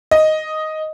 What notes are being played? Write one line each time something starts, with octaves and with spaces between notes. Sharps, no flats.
D#5